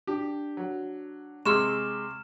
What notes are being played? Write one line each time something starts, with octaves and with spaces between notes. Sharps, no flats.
D4 G4
F#3
C3 G#3 C6 C#6 E6 F6 E7